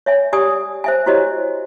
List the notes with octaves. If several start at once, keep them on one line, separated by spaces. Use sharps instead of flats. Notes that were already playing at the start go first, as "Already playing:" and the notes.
C#5 E5 G#5
G4 D5 G#5 D#6
C5 E5 G#5
E4 F#4 G4 C5 C#5 D#5